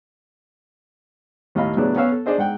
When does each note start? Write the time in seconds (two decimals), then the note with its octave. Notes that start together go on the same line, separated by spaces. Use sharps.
1.55 D#2 A2 D#5 F5 B5
1.77 A2 C#3 F#3 B3 D4
1.96 B3 C#4 C#5 F5 E6
2.12 A4
2.26 D4 G#4 C5 D#5
2.38 G#2 F#5 G5